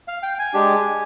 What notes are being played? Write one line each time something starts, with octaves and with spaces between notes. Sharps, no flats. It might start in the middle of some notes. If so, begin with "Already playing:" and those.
F5
G5
G#5
G#3 D4 G4